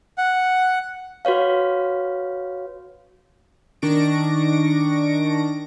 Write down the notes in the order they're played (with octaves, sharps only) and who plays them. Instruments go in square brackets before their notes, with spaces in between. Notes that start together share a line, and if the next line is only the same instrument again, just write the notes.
[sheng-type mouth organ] F#5
[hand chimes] F#4 B4 C#5 F5
[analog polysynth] D#3 D4 C#6 A#6 D7